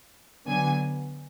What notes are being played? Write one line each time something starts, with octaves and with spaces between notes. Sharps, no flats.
D3 F#3 B3 G#5